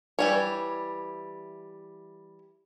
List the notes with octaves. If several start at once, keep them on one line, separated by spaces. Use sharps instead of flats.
E3 G3 C#5